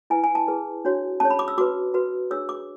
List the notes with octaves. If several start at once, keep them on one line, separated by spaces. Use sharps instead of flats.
E4 B4 G#5
G#5
A5
E4 G#4 B4
D4 F#4 C#5
C#4 G#4 C#5 A5
B5
D6
E6
F#4 B4 D6
F#4 B4
D4 G#4 C#5 E6
D6